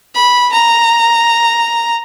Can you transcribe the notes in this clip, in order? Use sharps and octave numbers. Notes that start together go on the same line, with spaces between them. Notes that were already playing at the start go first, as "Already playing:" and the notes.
B5
A#5